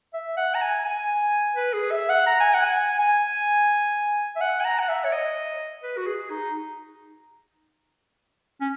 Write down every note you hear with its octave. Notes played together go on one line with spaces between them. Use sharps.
E5
F#5
A#5
G#5
G#5
B4
G#4
E5
F#5
A#5
G#5
F#5
G#5
G#5
E5
F#5
G#5
A#5
F#5
E5
C#5
D#5
B4
F#4
G#4
D#4
C#4